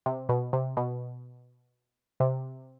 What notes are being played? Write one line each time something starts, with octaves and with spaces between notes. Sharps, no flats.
C3
B2
C3
B2
C3